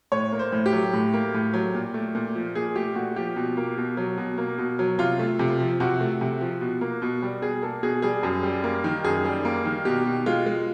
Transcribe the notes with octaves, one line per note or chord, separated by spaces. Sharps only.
A2 C#5
A#3
C5
A2
G4
F#3
A2
A#3
A2
F#3
A#2
A3
A#2
F3
A#2 G#4
A3 G4
A#2 F#4
F3 G4
B2
A#3
B2
F#3
B2
A#3
B2
F#3
C3 F4
A3
C3
F3
C3 F#4
A3
C3
F3
B2
A#3
B2
G3
B2 G#4
A#3 A4
B2 G#4
G3 G#4
F#2
G3
A#3
D#3
F#2 G#4
G3
A#3
D#3
B2 G4
B2
G#3 F4
G#3